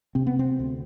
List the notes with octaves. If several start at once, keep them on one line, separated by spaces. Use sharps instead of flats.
C3 C4
B3
C4
D2